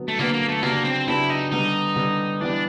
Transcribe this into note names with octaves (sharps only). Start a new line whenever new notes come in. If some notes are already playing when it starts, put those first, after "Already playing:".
Already playing: D3 F#3 B3
A3
D3 F#3 A#3 B3
A#3
A3
C#3 F#3 A#3 B3 D4 G4
C4
C#3 F#3 B3 D4 E4 G4
D#4
D3 G3 B3 D#4
D3 G3 B3
E3 G3 B3 D4